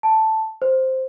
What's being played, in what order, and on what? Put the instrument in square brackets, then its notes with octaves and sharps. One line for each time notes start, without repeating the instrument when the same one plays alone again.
[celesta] A5
C5